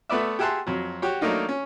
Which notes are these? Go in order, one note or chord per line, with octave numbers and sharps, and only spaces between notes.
A3 B3 B4 D5 E5
G4 G#4 E5 F#5 A5 C6
F2 F#3
F#4 G4 C#5
F#3 A3 A#3 D4 D#4 F4
C#4